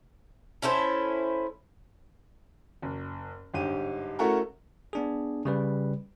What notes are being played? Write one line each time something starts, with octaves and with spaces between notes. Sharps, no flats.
C#4 E4 A4 C5
F#1
G1 G#2 G4 D#7
A3 C#4 E4 F#4 A4 A#4
B3 D4 G#4
C#3 G3 B4